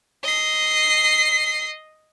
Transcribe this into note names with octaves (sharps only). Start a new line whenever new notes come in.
D#5 C7